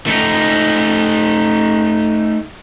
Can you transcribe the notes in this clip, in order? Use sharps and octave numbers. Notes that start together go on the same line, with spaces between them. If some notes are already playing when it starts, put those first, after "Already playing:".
A3 D#4